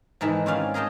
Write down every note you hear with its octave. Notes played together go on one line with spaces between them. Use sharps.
G#2 D#3 E3 E5 A5
C4 C#4 D5 F5 G#5
G#4 A#4 D#5 G5 A5